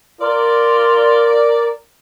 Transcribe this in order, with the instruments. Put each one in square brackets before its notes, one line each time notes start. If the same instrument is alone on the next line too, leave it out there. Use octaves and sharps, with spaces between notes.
[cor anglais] F4 [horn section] A#4 D5